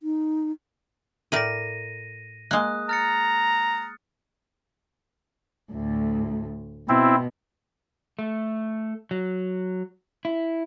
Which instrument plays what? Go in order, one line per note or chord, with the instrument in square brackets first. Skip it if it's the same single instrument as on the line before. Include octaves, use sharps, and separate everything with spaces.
[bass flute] D#4
[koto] A2 A#4 D5 [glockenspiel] A#6 D#7
[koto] G#3 A#3 [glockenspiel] D#6 F#6
[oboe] A#5 [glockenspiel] F6 A6 C#7
[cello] D2 A2
[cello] B2 [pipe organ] C4 E4
[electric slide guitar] A3
F#3
E4